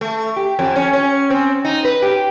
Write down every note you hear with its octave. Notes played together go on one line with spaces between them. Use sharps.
A3
G4
F2
C#4
C#4
C4
D#4
B4
G4